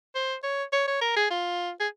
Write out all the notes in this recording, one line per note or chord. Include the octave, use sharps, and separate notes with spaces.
C5
C#5
C#5
C#5
A#4
G#4
F4
G#4